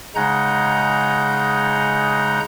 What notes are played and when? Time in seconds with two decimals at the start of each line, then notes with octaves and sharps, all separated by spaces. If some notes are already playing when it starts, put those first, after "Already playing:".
0.15 C#3 G#3 D#4 F#5 A#5 G6